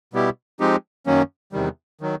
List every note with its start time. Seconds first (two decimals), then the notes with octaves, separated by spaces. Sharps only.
0.13 B2 G3 B3 E4 G4
0.60 F3 G#3 C4 D#4 G4
1.06 F#2 D#3 F#3 A#3 C#4
1.52 E2 C3 D#3 G3
2.01 D#3 F#3